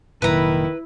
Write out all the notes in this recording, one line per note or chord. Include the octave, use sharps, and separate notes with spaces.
F1 A#2 D#3 F#3 E4 B4 A#5